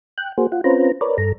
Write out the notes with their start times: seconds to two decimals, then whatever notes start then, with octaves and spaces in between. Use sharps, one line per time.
0.18 G5 F#6
0.38 A#3 F#4 G#4 C5
0.52 F4 F#5
0.64 C4 C#4 F4 B4 C5 A#5
1.01 A#4 B4 C#5 D5
1.18 G2 A4 A#5